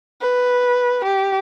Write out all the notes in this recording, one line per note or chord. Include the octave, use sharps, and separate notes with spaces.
B4
G4